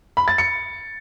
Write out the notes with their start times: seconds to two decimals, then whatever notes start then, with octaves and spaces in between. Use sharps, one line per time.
0.17 B5
0.28 A6
0.38 C#7